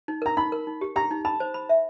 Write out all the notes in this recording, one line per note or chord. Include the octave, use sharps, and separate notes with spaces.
D#4
A#4 A#5
D#4 B5
A#4
D#4
G4
G4 A#5
D#4
A5 B5
C5
B5
E5